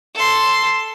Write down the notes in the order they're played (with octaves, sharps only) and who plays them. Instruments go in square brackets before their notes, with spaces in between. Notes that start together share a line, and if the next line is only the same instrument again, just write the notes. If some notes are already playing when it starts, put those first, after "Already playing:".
[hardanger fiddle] A4 C6